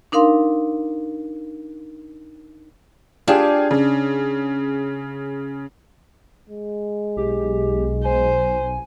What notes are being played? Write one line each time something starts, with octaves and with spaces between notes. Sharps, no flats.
D4 D#4 A#4 F5 C6
D4 F4 G4 G#4
C#3
G#3
B1 G4
C5 G#5